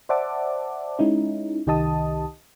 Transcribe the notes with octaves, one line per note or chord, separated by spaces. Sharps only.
C5 D5 E5 F#5 A5 D6
G#3 C#4 D#4 E4
C2 D#3 G4 D#5 A5 D#6